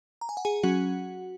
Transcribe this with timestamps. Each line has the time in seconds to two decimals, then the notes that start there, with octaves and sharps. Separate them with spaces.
0.21 A#5
0.29 G#5
0.37 F#5
0.45 G#4 G#5
0.63 F#3 C#4 F#4 F#5